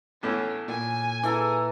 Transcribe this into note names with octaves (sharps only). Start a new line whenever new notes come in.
E2 A2 C#4
A#2 G#5
E3 A4 A#5